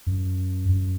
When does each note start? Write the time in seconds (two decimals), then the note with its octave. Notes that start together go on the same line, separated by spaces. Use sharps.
0.06 F#2
0.69 F#2